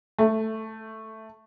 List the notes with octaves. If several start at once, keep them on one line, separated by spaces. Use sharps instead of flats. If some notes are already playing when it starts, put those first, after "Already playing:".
A3